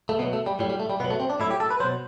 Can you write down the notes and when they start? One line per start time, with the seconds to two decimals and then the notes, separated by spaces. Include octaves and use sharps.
0.09 A3
0.19 B2 B3
0.22 F#3
0.33 A3
0.46 G3
0.59 A2 F#3 G3
0.69 G3
0.80 A3
0.90 G3
1.00 B2 B3
1.04 F#3
1.11 A3
1.20 C4
1.30 D4
1.40 A2 F#3 E4
1.51 G4
1.60 A4
1.70 B4
1.80 F#3 C5
1.84 B2